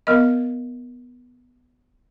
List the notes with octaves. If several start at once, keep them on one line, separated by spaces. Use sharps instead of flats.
B3 A#4 D#5